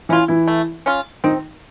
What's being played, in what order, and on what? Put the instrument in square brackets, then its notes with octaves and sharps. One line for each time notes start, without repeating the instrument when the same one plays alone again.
[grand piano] E3 E4 [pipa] C#4 F4
[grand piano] E3 E4
[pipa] A3
C#4 F4
[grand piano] D#3 D#4 [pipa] C4